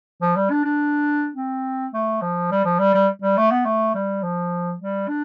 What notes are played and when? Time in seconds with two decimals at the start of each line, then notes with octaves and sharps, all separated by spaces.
0.21 F3
0.36 G3
0.51 D4
0.65 D4
1.36 C4
1.94 A3
2.22 F3
2.51 G3
2.65 F3
2.79 G3
2.94 G3
3.22 G3
3.37 A3
3.51 B3
3.65 A3
3.95 G3
4.23 F3
4.80 G3
5.08 D4